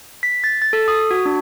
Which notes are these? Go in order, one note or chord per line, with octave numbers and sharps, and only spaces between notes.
B6
A6
A6
A4
D#6
F#4
D4